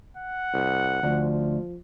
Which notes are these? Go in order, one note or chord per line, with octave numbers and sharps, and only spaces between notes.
F#5
C2
D2 F3